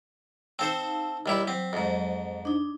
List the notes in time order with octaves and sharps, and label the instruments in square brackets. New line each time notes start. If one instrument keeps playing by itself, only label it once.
[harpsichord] C4 A4 C5 [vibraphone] D#4 F5 A5
[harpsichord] D#2 G3 E4
[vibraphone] F#3 [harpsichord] C4
[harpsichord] F2 G#2
[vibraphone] D4 D#4